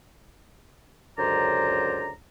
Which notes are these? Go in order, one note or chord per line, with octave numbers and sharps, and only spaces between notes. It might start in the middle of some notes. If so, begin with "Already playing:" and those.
C#2 F#2 D3 C5 D5 A#5